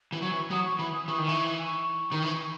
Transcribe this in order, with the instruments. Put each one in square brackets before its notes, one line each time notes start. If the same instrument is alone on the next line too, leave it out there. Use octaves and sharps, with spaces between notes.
[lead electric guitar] E3
[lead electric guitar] F#3 [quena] C#6
[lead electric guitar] E3
[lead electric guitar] F#3 [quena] D#6
[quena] C#6
[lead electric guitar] E3 [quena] B5
[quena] D#6
[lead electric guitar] E3 [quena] C#6
[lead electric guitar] D#3
E3
[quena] C#6
[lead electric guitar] D#3
E3